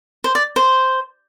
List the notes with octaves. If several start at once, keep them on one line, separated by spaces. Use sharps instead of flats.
C5
D5
C5